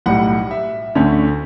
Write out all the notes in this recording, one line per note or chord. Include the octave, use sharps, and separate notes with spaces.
B1 A2 G3 F#5
E5
D2 D3 A3 C#4